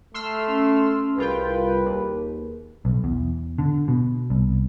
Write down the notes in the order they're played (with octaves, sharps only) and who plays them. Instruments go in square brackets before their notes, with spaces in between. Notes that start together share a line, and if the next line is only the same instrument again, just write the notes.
[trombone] A3 [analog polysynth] C6 E6 F6
[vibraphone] C#4
[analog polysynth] C2 F4 G5 [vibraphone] G#4 A#4 [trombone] B4
[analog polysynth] D#2
[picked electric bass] B1
E2
D3
B2
C2